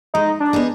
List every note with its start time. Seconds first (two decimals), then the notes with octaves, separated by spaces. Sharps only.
0.14 G#3 D#4
0.40 D4
0.53 B3 D#4 G#4